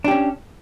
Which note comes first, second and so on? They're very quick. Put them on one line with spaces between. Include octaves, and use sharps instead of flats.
D4 G4 C#4